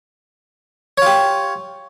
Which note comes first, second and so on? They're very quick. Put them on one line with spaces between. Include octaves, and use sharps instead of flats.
C#5 F4 G4